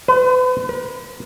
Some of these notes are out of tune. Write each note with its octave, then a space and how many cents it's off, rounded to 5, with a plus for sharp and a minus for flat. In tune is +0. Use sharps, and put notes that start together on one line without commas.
B4 +40
B4 -45